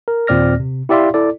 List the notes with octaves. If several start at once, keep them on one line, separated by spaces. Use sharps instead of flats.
A#4
D#2 A#2 C4 D5 F6 A#6
C3
E4 G4 D5 E5 F5 C6
E4 A4 D5